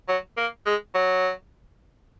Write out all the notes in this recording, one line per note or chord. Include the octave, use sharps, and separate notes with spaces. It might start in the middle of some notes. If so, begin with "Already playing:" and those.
F#3
A#3
G#3
F#3